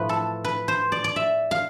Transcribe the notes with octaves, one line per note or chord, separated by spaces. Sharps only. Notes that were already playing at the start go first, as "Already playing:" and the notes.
Already playing: A2 F3 B4
A4
B4
C5
D5
D5
E5
F5